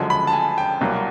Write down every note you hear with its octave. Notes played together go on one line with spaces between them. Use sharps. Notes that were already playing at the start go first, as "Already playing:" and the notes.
Already playing: F#1 F#2 D3 F3 G#3
B5
A5
G#5
G5
C2 B2 F#3 A#3